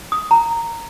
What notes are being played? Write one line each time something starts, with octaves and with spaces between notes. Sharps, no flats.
D#6
A#5